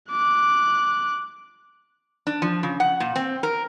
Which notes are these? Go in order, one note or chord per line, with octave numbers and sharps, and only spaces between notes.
D6 F#6
D4
F3
C#3
F#5
A#2
C4
A#4